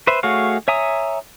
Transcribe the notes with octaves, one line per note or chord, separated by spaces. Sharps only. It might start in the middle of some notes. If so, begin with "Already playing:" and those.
B4 C5 E5
A3 F#4 G#4 C#5 F5
C#5 E5 G#5 A#5 D#6